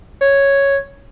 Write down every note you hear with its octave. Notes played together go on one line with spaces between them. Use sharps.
C#5